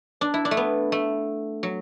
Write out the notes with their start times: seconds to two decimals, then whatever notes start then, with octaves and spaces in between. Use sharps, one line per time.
0.21 D4
0.34 E4
0.45 D4
0.51 A3
0.57 B3
0.92 A3
1.63 F#3